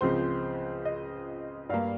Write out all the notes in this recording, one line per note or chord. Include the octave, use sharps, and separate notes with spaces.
C#2 C#3 F3 C4 C5
D#5
G2 G3 A#3 F5